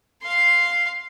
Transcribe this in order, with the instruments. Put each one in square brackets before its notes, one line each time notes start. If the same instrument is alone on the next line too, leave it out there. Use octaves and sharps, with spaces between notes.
[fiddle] F5 C6